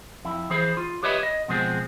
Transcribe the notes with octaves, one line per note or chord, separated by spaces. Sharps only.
F2 E4
E3 G#4 C5 B5
F4
G4 B4 C#5 D#5 E5 B5
D#5
B2 F3 G#3 C4 G#4